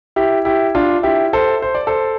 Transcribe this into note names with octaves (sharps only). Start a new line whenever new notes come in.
E4 G4
E4 G4
D4 F4
E4 G4
A4 C5
C5
D5
A4 C5